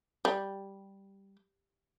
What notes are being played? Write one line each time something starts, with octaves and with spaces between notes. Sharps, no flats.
G3